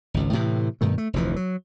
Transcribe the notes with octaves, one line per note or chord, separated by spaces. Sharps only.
G#1 C#2
A2 C3 E3
G2 B2 D#3 A3
A3
F1 D2 E3 F3
F#3